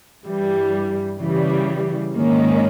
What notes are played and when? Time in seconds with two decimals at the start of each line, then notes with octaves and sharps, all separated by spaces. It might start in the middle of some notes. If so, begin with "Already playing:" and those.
0.23 G2 E3 G3
1.19 C#3 E3 G3
2.14 G#2 D#3 A#3 C#4